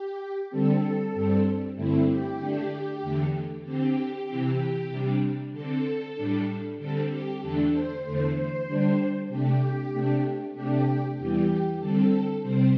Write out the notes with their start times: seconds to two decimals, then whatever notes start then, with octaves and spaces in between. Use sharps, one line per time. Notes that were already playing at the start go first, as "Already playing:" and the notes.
Already playing: G4
0.51 D3 G3 C4 A4
1.14 G2 G3 C4
1.76 G2 D3 A3 C4 E4
2.08 G4
2.39 D3 A3 D4
3.02 E2 D3 A3
3.65 D3 C4 G4
4.27 C3 E3 C4
4.90 C3 G3 D4
5.52 D3 C4 A4
6.15 A2 G3 D4
6.79 D3 G3 C4 A4
7.10 G4
7.40 E2 D3 A3 D4 A4
7.73 C5
8.03 E2 D3 A3 C5
8.35 C5
8.67 D3 G3 D4
9.29 C3 A3 D4 G4
9.93 C3 A3 D4
10.55 C3 A3 D4 G4
11.18 E2 E3 G3 G4
11.80 D3 G3 C4 A4
12.42 C3 G3 C4 C5